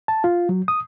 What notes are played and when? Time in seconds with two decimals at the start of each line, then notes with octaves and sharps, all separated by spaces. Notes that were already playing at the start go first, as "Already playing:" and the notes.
0.08 A5
0.24 F4
0.49 F#3
0.68 D#6